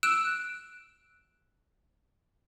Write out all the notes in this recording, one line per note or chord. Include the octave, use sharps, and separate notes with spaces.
E6 F#6 D7 E7